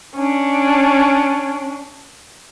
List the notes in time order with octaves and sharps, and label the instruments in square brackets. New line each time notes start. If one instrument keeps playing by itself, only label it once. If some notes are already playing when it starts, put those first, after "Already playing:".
[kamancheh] C#4 D4